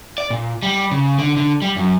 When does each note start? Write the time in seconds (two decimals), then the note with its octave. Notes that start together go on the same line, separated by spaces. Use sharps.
0.18 D5
0.30 A#2
0.63 G3
0.91 C#3
1.19 D3
1.37 D3
1.62 G3
1.77 F#2